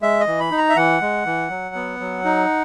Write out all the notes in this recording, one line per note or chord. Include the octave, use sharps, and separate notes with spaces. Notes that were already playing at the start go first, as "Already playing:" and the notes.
G#3 E5
D#5
E3
B5
D#4
A#5
E5
E3 F#5
G#3
E3
F#3
B3
F#3
D#4